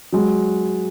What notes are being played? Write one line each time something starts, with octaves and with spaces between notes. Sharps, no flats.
F#3 G#3